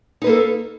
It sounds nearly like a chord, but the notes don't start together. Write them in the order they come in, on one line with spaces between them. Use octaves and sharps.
D#4 B4 A#3 A4